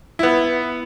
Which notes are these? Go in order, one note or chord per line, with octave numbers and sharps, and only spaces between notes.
B3 E4